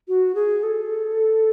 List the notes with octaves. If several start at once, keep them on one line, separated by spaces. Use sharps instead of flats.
F#4
G#4
A4